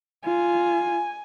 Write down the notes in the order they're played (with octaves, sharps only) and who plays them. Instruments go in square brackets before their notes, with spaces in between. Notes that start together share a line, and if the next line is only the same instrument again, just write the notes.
[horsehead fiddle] F4 [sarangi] G#5